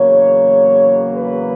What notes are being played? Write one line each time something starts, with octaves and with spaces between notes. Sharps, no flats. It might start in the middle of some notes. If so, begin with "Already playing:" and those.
Already playing: E2 C#3 F#3 A#3 C#5
B4